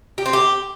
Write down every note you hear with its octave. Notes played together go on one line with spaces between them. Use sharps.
G4
C4
G4